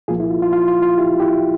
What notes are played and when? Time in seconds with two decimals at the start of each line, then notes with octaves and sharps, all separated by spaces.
0.08 C2 A#2 F3 A#3 F4 G#4
0.20 E4
0.30 F4
0.42 F4
0.53 F4
0.68 F4
0.82 F4
0.98 E4 G4
1.20 E4 G4